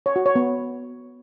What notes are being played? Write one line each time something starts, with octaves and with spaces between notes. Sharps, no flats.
C#5
F#4
C#5
B3